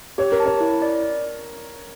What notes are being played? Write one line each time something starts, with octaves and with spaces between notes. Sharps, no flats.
G4 C#5
A#4
A5
C#5
E4
D5